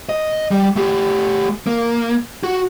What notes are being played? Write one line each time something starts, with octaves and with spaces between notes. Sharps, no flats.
D#5
G3
A3 G4
A#3
F#4